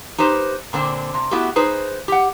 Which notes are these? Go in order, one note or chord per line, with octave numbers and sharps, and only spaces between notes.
D#4 G4 B4 C5
A#2 D3 C4 D4
C3
A3 B3 E4 F#4 G4
D#4 G#4 B4 C5
G4 F#5